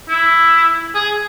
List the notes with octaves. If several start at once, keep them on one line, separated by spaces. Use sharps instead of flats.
E4
G#4